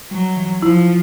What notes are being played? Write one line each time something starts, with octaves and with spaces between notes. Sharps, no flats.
F#3 G3
E3
F3 E4